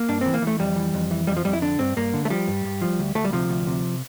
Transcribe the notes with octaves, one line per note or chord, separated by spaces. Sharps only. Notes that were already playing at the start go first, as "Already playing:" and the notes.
Already playing: A#3
G2 D4
E3 C4
A#3
E3
A3
F2 G3
E3
F2
E3
F2 G3
F3
F2 G3
E4
D3 D4
G2 C4
G2 A#3
D3
A3
F3 G3
G2
G2
F3
D2
D2 A3
G3
C3 F3
D2
C3